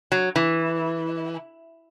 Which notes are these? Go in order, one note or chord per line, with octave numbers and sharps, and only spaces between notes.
F#3
E3